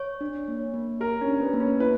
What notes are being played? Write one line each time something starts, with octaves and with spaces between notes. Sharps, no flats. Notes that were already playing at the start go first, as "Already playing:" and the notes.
Already playing: C#5
D4
A#3
A#3
G4 A#4
C#4
D4
B3
A#3
C#4
E4 B4